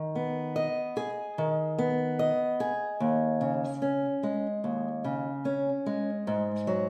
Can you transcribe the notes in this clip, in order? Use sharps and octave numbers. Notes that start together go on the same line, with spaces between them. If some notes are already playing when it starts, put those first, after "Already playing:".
Already playing: D#3
B3
D#5
G#4
D#3
B3
D#5
G#4
D#2
C#3
C#4
G#3
D#2
C#3
C#4
G#3
G#2
F#3